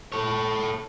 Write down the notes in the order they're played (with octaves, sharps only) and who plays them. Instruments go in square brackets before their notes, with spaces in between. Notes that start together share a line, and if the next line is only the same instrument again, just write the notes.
[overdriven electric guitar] A4 C#5